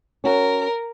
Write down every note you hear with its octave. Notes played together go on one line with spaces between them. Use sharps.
C#4 F#4 A#4